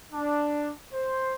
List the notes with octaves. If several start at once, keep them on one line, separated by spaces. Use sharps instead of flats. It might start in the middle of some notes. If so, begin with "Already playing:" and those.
D4
C5